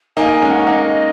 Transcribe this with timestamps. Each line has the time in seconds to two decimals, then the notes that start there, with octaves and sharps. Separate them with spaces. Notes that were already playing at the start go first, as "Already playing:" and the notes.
0.17 A#3 D#4 G#5
0.34 G#5
0.42 G#3 C#4
0.50 F#5
0.57 C#4
0.67 A#3 D#4 D#5